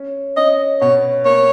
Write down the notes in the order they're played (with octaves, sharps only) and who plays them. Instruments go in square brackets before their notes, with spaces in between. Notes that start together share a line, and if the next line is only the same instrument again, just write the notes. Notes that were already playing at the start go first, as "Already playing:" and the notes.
Already playing: [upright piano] C#4
[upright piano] C#4 [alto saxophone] D#5
[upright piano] B2 [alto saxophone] C#5
[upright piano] A#3 [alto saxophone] C#5